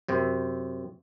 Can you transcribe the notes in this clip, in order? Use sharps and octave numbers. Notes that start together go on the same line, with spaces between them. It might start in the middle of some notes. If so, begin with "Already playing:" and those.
F#2 C3 C4